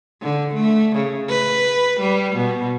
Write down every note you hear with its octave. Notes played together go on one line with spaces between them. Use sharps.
D3
A3
C#3
B4
G3
B2